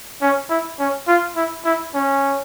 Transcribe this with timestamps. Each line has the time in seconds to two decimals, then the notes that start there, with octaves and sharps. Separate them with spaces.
0.22 C#4
0.50 E4
0.79 C#4
1.08 F4
1.36 E4
1.65 E4
1.94 C#4